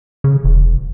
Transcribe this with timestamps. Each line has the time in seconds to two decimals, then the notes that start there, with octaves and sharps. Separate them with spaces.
0.24 C#3
0.44 E1